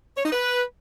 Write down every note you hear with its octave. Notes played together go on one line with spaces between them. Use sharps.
C#5
D#4
B4